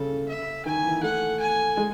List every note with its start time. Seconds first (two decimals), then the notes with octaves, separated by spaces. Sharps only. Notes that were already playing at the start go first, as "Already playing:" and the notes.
Already playing: C#3 A4
0.28 E5
0.66 D#3 G#5
0.84 E3
1.03 A3 F#5
1.40 G#5
1.77 G#3